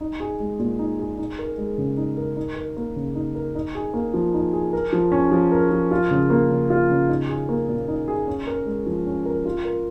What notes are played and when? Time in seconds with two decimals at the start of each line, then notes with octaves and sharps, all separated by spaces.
0.01 D#4
0.20 G#4
0.40 G#3
0.59 A#2
0.79 D#4
0.99 G#4
1.18 D#4
1.39 A#4
1.58 G#3
1.78 C#3
1.97 D#4
2.17 A#4
2.37 D#4
2.56 A#4
2.77 A#3
2.96 C#3
3.15 D#4
3.35 A#4
3.55 D#4
3.75 G#4
3.94 A#3
4.14 F3
4.34 D#4
4.53 G#4
4.73 A#4
4.93 F3
5.12 C#4
5.32 F3
5.52 A#4
5.71 F3
5.91 F4
6.11 C#3
6.30 A#3
6.50 C#3
6.70 F4
6.90 C#3
7.09 D#4
7.29 G#4
7.49 A#3
7.68 A#2
7.88 D#4
8.08 G#4
8.27 C#4
8.47 A#4
8.66 G#3
8.86 F3
9.06 C#4
9.25 A#4
9.45 F4
9.65 A#4